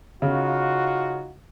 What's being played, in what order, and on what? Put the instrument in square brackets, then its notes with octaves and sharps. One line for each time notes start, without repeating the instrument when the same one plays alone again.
[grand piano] C#3 [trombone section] D#4 F4 F#4